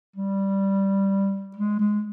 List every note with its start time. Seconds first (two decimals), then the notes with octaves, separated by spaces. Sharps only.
0.16 G3
1.57 G#3
1.80 G#3